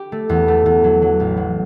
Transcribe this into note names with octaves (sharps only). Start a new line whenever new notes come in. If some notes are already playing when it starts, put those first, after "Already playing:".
Already playing: G4
A3
E2
A3
E2
F#3
F#3
A1
F#3